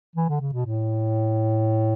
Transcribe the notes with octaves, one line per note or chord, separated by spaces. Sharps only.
E3
D3
C#3
B2
A2